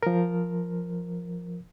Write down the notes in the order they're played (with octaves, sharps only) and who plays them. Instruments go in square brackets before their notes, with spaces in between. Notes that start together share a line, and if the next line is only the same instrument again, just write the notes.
[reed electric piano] F3 A#4